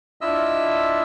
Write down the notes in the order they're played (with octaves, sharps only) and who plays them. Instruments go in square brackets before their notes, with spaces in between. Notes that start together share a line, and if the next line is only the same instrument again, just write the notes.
[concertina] D4 E4 F4 D#5 E5 E6